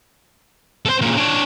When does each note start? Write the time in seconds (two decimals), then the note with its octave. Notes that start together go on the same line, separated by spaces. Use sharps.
0.86 A4 C5
1.01 A#2 C#3
1.17 D4 C#5